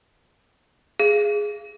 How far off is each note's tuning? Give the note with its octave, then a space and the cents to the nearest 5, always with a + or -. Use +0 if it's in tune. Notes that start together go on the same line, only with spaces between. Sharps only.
G#4 +0 F5 -30